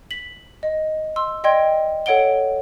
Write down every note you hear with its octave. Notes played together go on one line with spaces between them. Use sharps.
B6 F#7
D#5
C6 E6
D5 D#5 G5 C6 G#6 D7
A4 C#5 F#5 D7 G7